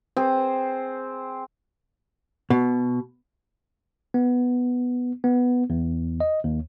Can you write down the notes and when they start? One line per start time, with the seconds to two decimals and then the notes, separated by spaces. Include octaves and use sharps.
0.17 C4 G#4
2.50 B2
4.14 B3
5.24 B3
5.70 E2
6.20 D#5
6.44 D#2